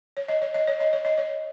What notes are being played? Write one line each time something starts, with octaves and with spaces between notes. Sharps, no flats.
C#5
D#5
C#5
D#5
C#5
D#5
C#5
D#5
C#5